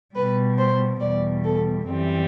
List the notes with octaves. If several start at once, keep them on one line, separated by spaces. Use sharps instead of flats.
B2 G3 B4
C5
E2 B2 G3 D5
A4
F#2 E3 G3 C4